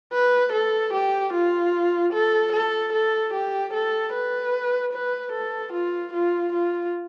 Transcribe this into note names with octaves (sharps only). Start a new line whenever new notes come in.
B4
A4
G4
F4
A4
A4
A4
G4
A4
B4
B4
A4
F4
F4
F4